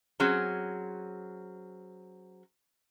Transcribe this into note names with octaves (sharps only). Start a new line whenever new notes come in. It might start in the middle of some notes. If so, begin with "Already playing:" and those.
F#3 C4 C#4 G#4